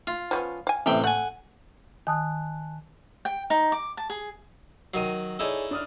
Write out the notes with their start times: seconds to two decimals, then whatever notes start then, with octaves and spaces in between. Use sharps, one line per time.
0.07 F4
0.31 F3 B3 C#4
0.67 F5 G#5
0.86 A1 C3 G5
1.04 A3 F#5 G#5
2.07 D#3 G#5 A5 D#6 F#6
3.25 G5
3.50 D#4
3.72 D6
3.97 A5
4.10 G#4
4.94 D#3 F#3 C7 D#7
5.39 D#4 E4 G#4 A4 C#5 D5
5.71 D4 D#6 F6